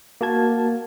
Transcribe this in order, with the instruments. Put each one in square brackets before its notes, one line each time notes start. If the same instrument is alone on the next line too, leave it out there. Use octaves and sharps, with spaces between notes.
[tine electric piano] A#3 F#4 A5 G#6